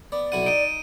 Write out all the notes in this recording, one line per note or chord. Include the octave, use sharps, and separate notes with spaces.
B3 D5
B1 E4 F#5 D#7
D#4 D7 D#7